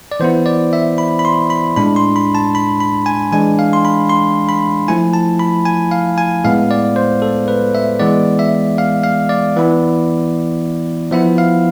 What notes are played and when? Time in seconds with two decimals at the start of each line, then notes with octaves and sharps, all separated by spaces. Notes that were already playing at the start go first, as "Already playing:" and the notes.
0.12 D5
0.20 E3 B3 E4 C5
0.46 D5
0.73 E5
0.98 B5
1.19 B5
1.25 C6
1.50 B5
1.76 A2 G#3 D4 B5
1.96 C6
2.16 B5
2.35 A5
2.55 B5
2.80 B5
3.06 G#5
3.32 E3 G#3 D4 G#5
3.59 F5
3.73 C6
3.85 B5
4.10 C6
4.49 B5
4.88 F3 A3 E4 G#5
5.13 A5
5.39 B5
5.65 G#5
5.91 F5
6.18 G#5
6.44 A2 G#3 B3 F5
6.71 D5
6.96 C5
7.22 A4
7.48 B4
7.75 E5
7.99 E3 G#3 B3 D5
8.39 E5
8.78 F5
9.03 F5
9.29 D5
9.57 E3 B3 E4
11.11 F3 B3 E4 E5
11.38 F5